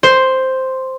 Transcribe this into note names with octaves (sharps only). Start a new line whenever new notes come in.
C5